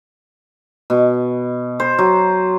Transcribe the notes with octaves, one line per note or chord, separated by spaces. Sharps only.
B2
C5
F#3